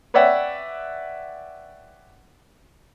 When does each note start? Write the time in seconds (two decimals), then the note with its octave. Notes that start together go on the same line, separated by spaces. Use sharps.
0.14 B4 C#5 D5 E5 F#5 G5